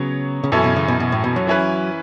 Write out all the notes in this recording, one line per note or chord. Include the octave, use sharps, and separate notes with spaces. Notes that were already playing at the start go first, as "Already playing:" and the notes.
Already playing: C#3 F#3 B3 C#5
C#3
F#2 B2 E3 C#4 E4 A4
B2
C#3
B2
B2
A2
B2
F#3
E3 C#4 E4 B4